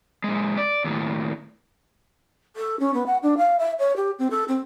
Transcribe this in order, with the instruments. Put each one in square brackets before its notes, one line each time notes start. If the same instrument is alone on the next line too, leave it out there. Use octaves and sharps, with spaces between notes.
[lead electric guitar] A#2 G#3
D5
D#2 A2
[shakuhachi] A4
C#4
B3
F#5
D4
F5
E5
C#5
G4
C4
A4
C4